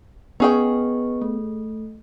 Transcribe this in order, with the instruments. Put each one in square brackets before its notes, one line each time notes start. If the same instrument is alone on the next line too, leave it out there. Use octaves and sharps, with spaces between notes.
[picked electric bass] B3 [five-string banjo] C#4 G#4 G5 [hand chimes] B4 D#5 C#6
[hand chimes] A3